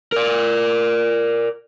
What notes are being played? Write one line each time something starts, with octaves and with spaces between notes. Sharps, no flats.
A#4 D5